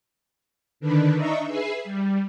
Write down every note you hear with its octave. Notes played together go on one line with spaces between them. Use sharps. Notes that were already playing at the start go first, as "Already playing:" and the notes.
D3 D#3 D4 B4
D4 D#4 D#5 E5 A#5 C#6
G#4 B4 E5 C7
G3